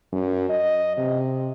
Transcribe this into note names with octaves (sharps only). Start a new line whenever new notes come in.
F#2
D#5
C3